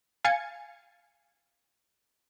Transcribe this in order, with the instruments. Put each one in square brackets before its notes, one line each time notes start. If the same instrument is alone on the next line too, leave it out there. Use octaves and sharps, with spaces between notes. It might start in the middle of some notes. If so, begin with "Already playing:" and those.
[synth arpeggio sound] F5 G#5 G#6 A6 C#7